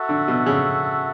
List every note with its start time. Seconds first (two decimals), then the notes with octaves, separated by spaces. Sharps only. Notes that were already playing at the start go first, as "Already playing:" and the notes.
Already playing: F#4 A4 E5
0.09 D3
0.28 B2
0.46 C#3